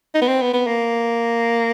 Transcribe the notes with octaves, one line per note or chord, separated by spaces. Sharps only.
D#4
B3
C4
B3
B3
A#3